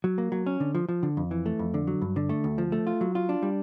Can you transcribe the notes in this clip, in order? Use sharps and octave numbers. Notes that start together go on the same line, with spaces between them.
F#3
A#3
F#3
C#4
D3
F3
F3
D3
F2
E3
A3
F2
D3
F#3
G2
D3
A3
D2
F3
A3
F4
F#3
F4
D4
G3